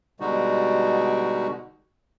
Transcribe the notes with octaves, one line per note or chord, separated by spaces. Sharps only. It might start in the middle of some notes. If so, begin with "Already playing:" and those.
B2 D3 G3 G#3 D#4 F#4